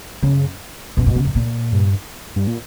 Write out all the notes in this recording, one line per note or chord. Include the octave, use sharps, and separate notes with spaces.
F#2 C#3
F#2 B2
G2
C#3
F#2
A#2
G2
G2
A#2